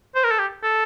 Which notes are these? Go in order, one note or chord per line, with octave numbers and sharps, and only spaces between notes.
C5
A#4
A4
G4
A4